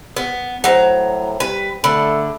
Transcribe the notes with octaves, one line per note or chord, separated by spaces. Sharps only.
B3
A2 F#3 C5 F#5 A#5
G3 B4
D3 A3 B5